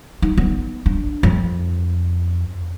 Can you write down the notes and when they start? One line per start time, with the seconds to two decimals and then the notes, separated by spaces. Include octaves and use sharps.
0.22 D#4
0.37 B3
0.86 D4
1.23 F2